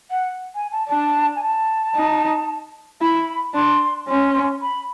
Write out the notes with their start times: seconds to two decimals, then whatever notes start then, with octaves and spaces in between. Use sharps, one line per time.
0.10 F#5
0.54 G#5
0.71 A5
0.89 D4 A5
1.35 G#5
1.43 A5
1.96 D#4
3.01 E4 B5
3.54 D4 C6
4.08 C#4 C6
4.61 B5